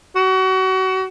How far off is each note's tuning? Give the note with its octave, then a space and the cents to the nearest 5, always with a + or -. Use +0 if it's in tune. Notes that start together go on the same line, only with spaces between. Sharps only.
F#4 +30